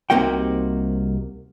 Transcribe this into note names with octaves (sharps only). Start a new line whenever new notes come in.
C2 C3 A#3 D#4 F#4 G5